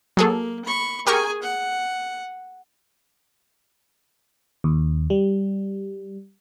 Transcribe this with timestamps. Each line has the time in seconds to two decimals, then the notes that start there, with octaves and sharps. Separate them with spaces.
0.17 F#3 A#3 G#4 A4
0.65 B5 C#6
1.07 G4 G#4 A#4 G#5 C#6
1.42 F#5
4.64 D#2
5.10 G3